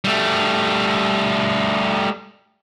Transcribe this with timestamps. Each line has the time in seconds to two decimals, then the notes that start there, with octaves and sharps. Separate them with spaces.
0.04 G3 A3